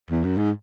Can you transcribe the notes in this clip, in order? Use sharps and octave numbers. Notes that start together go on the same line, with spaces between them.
E2
F#2
G#2